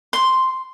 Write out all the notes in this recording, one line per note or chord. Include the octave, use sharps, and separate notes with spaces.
C6